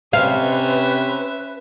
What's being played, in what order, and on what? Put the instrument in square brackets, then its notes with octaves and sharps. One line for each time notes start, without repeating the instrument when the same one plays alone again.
[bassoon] C3 [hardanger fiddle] C#4 E5 [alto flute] B4 [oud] F5